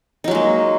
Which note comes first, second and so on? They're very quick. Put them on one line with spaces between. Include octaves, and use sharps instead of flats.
D#4 F#3 G#3 A#3